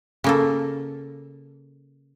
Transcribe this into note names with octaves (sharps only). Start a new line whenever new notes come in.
C#3 A#3 A4